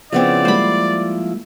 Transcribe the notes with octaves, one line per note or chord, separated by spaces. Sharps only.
C#3 F3 B3 C4 E4 D5
G3 G#3 A#3 C5 B5